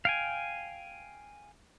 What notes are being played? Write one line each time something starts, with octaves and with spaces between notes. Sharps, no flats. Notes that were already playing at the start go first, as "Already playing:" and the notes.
F5 G5 G#5